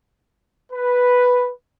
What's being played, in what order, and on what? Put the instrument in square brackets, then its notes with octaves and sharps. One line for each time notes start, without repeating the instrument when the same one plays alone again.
[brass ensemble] B4